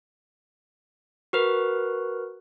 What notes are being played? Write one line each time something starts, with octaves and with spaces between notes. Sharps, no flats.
F#4 A#4 B4